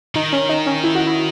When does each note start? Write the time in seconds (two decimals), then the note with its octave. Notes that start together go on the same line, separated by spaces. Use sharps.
0.15 D#3 D#4
0.33 C#4
0.49 D#4
0.66 C#4
0.84 E4
0.95 F#4
1.07 E4